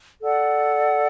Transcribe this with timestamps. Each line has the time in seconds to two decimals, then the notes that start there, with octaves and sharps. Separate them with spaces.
0.20 A4 D5 F#5